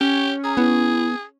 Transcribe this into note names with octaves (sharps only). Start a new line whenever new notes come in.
C#4 G4
G#4 A#5
B3 E4